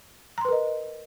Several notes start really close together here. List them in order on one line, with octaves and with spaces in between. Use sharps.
A#5 C6 B4 A#4 D#5